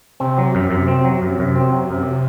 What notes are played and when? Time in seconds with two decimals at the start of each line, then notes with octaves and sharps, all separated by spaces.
0.20 C3 C4
0.38 F#3
0.55 F#2
0.71 F#2
0.88 C4
1.05 F#3
1.22 F#2
1.39 F#2
1.56 C4
1.72 F#3
1.90 F#2